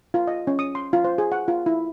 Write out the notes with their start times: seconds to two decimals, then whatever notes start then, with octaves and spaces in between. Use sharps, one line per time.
0.14 F4
0.27 D#5
0.47 C#4
0.59 D#6
0.75 C6
0.93 F4
1.04 C5
1.18 G#4
1.32 F#5
1.48 F4
1.66 E4